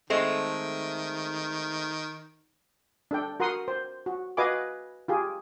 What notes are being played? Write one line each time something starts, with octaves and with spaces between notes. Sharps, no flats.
D#3 G#3 A3 C4
D4 A4 G5
F#4 A#4 F#5 C6 D#6
C5
F#4
F#4 B4 D#5 F5 G#5 D6
F4 G4 G#4